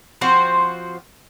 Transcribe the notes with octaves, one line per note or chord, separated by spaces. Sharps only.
F3 C4 F#4 C5